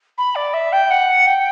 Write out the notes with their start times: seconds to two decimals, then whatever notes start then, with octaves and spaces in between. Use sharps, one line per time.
0.18 B5
0.35 D5
0.53 E5
0.72 G5
0.90 F#5
1.26 G5